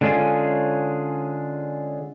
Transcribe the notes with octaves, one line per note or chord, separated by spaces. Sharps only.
D3 G#3 C#4 F4 G#4